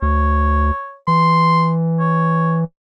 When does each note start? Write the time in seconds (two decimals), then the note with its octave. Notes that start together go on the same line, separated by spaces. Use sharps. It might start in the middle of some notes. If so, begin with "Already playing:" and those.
0.02 D2 C#5
1.07 E3 C6
2.00 C#5